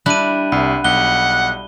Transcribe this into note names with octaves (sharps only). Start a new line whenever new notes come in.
G3 D4 E4 F#6 D#7
C2 B5
B1 F#5 G7